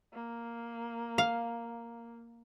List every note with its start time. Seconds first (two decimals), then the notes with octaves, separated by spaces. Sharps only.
0.13 A#3
1.18 F5